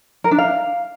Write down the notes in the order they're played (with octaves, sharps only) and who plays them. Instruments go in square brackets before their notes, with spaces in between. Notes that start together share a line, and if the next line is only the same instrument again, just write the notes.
[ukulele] A#4
D4
F5